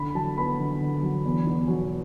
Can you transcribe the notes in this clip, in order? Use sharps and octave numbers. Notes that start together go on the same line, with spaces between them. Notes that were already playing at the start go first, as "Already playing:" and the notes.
Already playing: D3 B5
F#3 A5
B3 B5
D3
D3
F#3
E2
B2
F#3